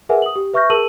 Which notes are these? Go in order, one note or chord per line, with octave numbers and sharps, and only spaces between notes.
G#4 A#4 B4 E5 F#5 G#5
D#6 F#7
G4
B4 E5 C#6 F6 G6 A#6
G#4 A#4 A5 E6 D#7 F#7